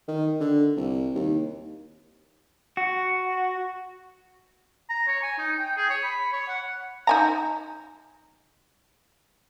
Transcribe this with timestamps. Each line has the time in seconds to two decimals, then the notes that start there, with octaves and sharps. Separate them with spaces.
0.08 D#3
0.40 D3
0.77 C2
1.15 D#2
2.77 F#4
4.89 A#5
5.07 C#5
5.23 G#5
5.38 D#4
5.59 G5
5.77 G#4
5.90 C#5
6.03 B5
6.33 C#5
6.48 F#5
7.07 D#4 G#5 A#5